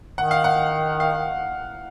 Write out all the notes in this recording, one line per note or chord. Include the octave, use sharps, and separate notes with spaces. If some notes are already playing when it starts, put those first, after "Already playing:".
D#3 F#5
F5
F#5
F5